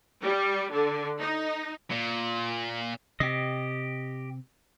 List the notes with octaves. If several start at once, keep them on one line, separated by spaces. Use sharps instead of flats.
G3
D3
D#4
A#2
C3 G4 D#5